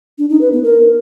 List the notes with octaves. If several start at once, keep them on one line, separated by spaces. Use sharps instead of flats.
D4
D#4
B4
B3
A#4